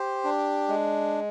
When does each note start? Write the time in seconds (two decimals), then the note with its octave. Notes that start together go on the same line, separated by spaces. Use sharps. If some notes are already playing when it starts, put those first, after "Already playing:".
Already playing: G4 C5
0.24 D4
0.68 G#3